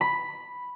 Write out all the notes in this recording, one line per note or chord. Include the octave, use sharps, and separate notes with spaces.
B5